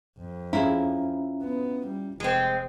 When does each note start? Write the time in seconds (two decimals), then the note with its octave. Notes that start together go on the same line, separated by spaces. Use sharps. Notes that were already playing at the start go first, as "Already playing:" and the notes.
0.19 F2
0.53 C#4 E4 F4 G#4 E5 A#5
1.43 B3
1.88 G3
2.20 F1 G#3 C4